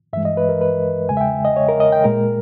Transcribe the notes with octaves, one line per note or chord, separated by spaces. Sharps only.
G2 E3 G#3 E5
D#5
B4
A#4
B4
E2 C#3 G#3 G#5
E5
G5
D#5
C#5
A#4
D#5
G5
A#2 G#3 A#4